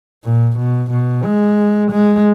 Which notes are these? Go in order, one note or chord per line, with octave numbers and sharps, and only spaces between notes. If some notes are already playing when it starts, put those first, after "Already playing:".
A#2
B2
B2
G#3
G#3